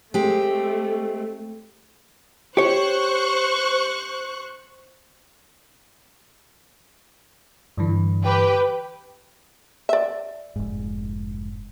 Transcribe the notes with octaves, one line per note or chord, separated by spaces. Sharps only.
G#3 A3 C4 G4
G4 C5 C#5 C#6 F#6
G2 D3 E3
G4 B4 G5
D5 E5
F1 G#2